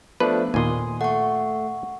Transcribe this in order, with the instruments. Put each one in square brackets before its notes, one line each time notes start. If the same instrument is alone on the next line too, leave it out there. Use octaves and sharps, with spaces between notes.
[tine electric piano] F3 A3 D4 [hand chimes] B3 [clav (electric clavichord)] B4
[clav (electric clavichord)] D#2 A#2 [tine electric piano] G#5 C6 D#6
[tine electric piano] A3 [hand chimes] F#5 C#6